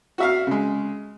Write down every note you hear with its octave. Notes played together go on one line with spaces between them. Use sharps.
F#4 E5 F5
C#3 G#3